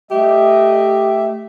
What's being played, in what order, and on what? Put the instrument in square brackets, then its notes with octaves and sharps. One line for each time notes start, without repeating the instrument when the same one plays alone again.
[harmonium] A3 E5 [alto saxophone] G4 [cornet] D#5